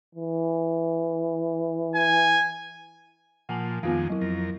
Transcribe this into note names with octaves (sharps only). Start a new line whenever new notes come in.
E3
G#5
A#2 F3 F#5 G#5 A5
F2 D#3 G#3 B3 F4 F5
F#3 E4
F2 A#4